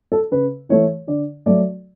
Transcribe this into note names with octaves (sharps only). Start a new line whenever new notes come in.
A4
C#3 B4
E3 A3 C#5
D3 D5
F#3 A3 D5